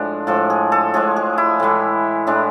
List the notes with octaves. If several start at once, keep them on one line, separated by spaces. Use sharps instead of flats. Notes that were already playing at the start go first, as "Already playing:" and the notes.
Already playing: A2 F3 G#3 D4
A2 F3 G#3 A4
G#4
A4
A2 F3 G#3 G#4
G#4
E4
A2 E3 G#3
A2 E3 G#3 D4